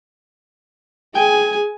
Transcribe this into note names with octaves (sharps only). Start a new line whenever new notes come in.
G#4 G5 G#5